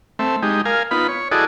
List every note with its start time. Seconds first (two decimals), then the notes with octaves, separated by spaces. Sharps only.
0.19 A3 C4 E5
0.42 G#3 D#4 G4
0.65 A#4 F5 G#5
0.91 B3 D#4 F4 B5
1.08 C#5
1.32 E4 F#4 G#4 A4 D5 D#5